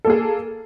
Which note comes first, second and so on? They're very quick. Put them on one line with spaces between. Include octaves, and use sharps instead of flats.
A4 A#3 G#4